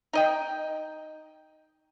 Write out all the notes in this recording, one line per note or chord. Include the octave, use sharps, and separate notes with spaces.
D#4 D#5 G5